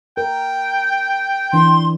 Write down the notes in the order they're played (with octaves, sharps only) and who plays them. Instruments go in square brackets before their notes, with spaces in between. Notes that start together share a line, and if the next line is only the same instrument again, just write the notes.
[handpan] A#4 [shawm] G5
[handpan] E3 D4 [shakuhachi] C6